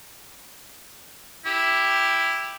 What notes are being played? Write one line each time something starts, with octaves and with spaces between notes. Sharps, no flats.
E4 G4